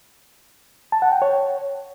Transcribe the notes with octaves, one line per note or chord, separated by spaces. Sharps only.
A5
F#5
G5
C#5